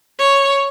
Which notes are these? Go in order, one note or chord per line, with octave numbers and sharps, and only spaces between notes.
C#5